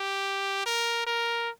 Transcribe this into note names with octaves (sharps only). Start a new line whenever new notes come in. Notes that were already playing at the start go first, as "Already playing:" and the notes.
Already playing: G4
A#4
A#4